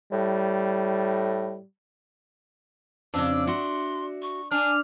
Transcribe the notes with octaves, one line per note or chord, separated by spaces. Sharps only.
A2 G3
F2 C#3 D4 E6
F#4 E5 C6
C#6
D4 G#5 F6